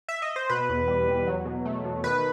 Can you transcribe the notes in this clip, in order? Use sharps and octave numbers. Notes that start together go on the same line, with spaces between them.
E5
D#5
C5
B2 B4
E2
G3
E2
F#3
B2
A3
B2
D#3 B4